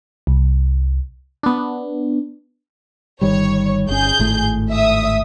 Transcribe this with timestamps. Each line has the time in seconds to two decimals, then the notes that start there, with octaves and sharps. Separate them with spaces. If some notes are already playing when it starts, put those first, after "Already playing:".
0.27 C2
1.43 B3 D4
3.21 G1 D#3 G3 C#5
3.89 G1 C#4 G#4 G6
4.19 G#1 A2 A3
4.70 E5 D#6